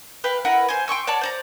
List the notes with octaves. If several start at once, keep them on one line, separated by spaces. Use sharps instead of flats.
B4 F5 G5
E4 A#4 B4 F#5
C5 G#5
G5 C6 C#6 E6
C#5 D5 F#5 A5
C5 D5 A#5